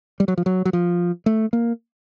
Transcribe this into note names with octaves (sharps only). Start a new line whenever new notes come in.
G3
F#3
F3
F#3
F#3
F3
A3
A#3